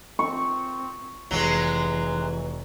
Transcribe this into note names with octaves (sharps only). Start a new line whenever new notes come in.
C4 C#6
F1 E3 F#3 G#3 G7